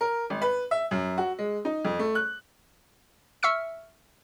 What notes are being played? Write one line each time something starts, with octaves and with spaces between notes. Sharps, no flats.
A#4
G#1
B4
E5
F#2
F#4
G#3
D#4
F2
A3
F#6
E5 C#6 E6 F6 C#7